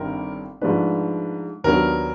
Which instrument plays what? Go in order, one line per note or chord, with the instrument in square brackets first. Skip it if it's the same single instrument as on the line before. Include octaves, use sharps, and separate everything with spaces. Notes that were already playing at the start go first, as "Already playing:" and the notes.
Already playing: [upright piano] G1 G2 D#3 G3 C4 [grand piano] A#4
[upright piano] G#2 F3 A3 D4 [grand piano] B4
[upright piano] D#2 D3 F#3 B3 D4 [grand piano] A#4